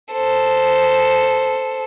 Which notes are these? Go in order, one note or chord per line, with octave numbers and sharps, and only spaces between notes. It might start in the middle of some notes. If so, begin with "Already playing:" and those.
A4 C5